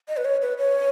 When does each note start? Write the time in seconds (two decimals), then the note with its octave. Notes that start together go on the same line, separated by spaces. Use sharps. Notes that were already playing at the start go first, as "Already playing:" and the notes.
0.08 D#5
0.17 B4
0.25 C#5
0.42 B4
0.58 C#5